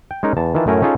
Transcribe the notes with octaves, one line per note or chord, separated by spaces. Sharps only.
G5
G#3 C#4 D#4 A#4
E2 A5
D#3 E3 F4 A5
F#2 A2 A3 C#4 A#4 G#5
C#4 D#4 F4 G#4 A4